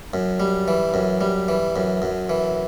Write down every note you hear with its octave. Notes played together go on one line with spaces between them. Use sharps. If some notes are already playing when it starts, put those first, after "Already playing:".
F#2
G3
E3
F#2
G3
E3
F#2
F#2
E3